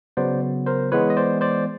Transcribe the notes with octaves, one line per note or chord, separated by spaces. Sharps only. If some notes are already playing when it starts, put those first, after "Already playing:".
C#3 F#3 B3 C5 D5
A#4 C5
E3 G#3 B3 B4 C#5
D#5
C5 D5
C5 D5